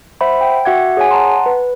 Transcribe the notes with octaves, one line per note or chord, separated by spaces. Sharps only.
C5 E5 F#5 B5
G5
F#4 E5 F#5 D6 G#6
G#4 C#5 F#5 G#5
F#5 A5 A#5 C6
B4